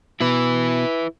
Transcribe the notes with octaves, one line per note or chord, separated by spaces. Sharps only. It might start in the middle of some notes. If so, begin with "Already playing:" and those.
B2 E4 B4